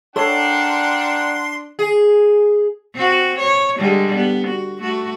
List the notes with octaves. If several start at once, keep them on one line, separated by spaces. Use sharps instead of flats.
D4 A4 A#4 C#5 F#5 G5 C6 C7
G#4
C4 F#4
C#5
D3 G3 G#3
B3
F#4
A3 F#4